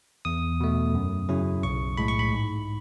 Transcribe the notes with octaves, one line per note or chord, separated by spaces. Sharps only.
E2 D#6
B2 A3
F#2
C#3 F#3 C#4 E4
B1 C#6
A2 G#3 B5
C#6
B5
G#2